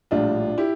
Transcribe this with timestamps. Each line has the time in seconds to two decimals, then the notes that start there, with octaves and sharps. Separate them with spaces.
0.11 A#1 A2 G3 D4 F4
0.58 E4 G4